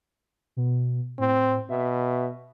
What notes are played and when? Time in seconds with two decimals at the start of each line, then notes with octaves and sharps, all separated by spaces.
0.57 B2
1.19 A2 C4
1.70 B2 E5